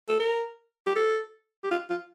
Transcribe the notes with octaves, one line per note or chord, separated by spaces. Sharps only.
A4
A#4
G4
A4
G4
F4
F4